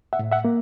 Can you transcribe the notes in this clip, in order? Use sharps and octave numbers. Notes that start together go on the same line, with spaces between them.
E5 F#5
A2
E5 F#5
A#3